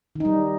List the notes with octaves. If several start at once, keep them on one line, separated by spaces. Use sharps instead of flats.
D#3 G3 D#4